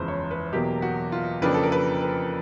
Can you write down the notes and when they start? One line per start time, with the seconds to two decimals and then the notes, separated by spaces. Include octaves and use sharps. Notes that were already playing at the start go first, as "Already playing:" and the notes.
Already playing: F#1 E2 C#3 F3 G#3 B4 C5
0.08 C#5
0.31 B4
0.53 E2 B2 F#3 A#3 G4
0.82 F#4
1.12 F4
1.42 F2 C#3 F3 A#3 D4 B4
1.54 A4
1.63 A#4
1.72 B4
2.01 B4